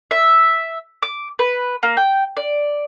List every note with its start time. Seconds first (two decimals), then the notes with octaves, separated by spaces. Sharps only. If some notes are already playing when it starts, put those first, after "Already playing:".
0.11 E5
1.03 D6
1.39 B4
1.83 A#3
1.97 G5
2.37 D5